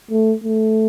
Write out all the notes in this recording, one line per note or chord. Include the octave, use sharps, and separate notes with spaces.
A3
A3